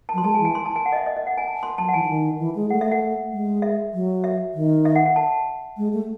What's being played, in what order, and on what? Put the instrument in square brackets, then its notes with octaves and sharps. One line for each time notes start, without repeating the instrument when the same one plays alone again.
[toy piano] A5
[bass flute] F#3 [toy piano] C6
[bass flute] G#3 [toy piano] A5
[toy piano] G#5
[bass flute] E3
[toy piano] G#5
C6
A5
G#5
F#5
D#5
E5
D#5
D#5
F#5
G#5
A5
C6
[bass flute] F#3 [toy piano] A5
[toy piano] F#5
[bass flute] E3 [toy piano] G#5
[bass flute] E3
D#3
E3
G#3
[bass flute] A3 [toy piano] F#5
[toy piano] E5
F#5
[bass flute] G#3
[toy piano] E5
[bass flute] F#3
[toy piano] E5
[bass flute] D#3
[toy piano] E5
F#5
F#5
A5
[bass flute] G#3
A3